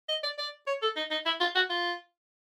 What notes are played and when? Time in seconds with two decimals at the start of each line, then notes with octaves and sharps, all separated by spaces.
0.09 D#5
0.23 D5
0.38 D5
0.67 C#5
0.82 A4
0.96 D#4
1.11 D#4
1.26 E4
1.40 F4
1.55 F#4
1.70 F4